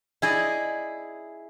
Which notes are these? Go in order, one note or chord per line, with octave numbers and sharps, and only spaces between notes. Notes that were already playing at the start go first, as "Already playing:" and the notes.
E4 G#4 D5 D#5